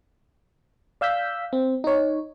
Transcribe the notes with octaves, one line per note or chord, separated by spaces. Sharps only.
D5 F5 E6 G6 B6
C4
D#4 C#5